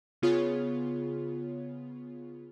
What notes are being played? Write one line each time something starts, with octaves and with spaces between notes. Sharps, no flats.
C#3 B3 F4 G#4 C#5